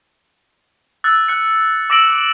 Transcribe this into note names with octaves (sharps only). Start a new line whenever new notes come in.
E6 F#6 A6
F#6 C#7
D6 E6 A#6 D7 F#7